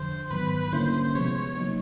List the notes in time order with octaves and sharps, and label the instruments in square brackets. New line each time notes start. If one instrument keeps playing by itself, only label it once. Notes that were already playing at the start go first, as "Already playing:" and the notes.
Already playing: [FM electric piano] F2 D3 F3 [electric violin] C5
[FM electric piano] G#2 D#3 F#3 B3 [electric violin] B4
[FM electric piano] D3 G3 A#3 C#4 E4 [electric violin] C5
[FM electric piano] C3 F3 G#3 B3 [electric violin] C#5
[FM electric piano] C#3 F#3 A#3 D#4